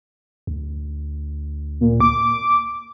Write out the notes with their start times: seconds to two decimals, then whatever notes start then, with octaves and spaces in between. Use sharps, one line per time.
0.47 D2
1.81 A#2
2.01 D6